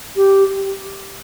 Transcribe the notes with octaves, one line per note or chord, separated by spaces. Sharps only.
G4